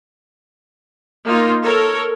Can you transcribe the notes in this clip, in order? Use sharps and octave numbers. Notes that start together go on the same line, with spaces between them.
A#3 D#4 F4
A4 A#4 C#5